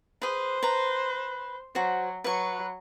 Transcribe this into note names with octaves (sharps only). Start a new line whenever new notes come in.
G#4 B4 C5
B4 A#5
F#3 F#4 C5
F#3 B4 C#6